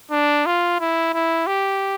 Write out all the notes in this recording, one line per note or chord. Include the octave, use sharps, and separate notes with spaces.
D4
F4
E4
E4
G4